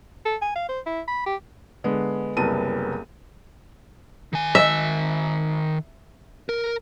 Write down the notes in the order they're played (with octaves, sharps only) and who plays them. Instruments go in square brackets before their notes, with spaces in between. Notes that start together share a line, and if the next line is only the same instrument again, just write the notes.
[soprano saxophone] A4
G#5
F5
C5
E4
B5
G4
[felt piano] D3 G#3 B3
F#1 C2 B3 A5 D#7
[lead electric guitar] D#3 G#5
[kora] E5
[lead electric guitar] A#4